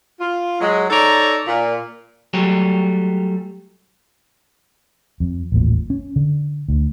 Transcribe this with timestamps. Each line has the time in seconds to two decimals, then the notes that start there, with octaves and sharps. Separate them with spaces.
0.20 F4
0.61 F#3 G#3
0.90 D#4 A4 C#5 D5 A#5
1.47 A#2
2.34 F#3 G3 A3 G4 G#4 C#5
5.20 F2
5.52 D#1 A1 A#2
5.90 C#4
6.16 D3
6.69 D2